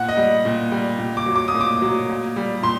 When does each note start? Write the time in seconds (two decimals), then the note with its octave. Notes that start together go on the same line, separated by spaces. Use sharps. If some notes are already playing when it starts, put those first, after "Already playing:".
Already playing: A#2 F#5
0.09 D#5
0.17 G3
0.45 A#2
0.72 G3
0.99 A#2
1.17 D6
1.26 F#3
1.36 D6
1.48 D#6
1.54 A#2
1.61 D6
1.82 F#3
2.09 A#2
2.36 G3
2.63 A#2 C6